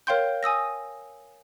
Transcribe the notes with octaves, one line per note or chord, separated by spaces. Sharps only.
A#4 C#5 F5 G5 C6 G6
G#5 D#6 E6 A#6